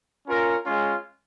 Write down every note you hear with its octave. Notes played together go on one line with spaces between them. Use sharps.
C#4 F4 A#4
G#3 C#4 F4